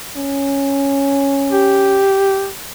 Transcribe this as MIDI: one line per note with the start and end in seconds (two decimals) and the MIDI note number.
0.17 2.04 61
1.52 2.49 67